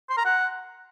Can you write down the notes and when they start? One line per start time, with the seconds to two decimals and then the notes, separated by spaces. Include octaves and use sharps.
0.10 C6
0.17 A#5
0.25 F#5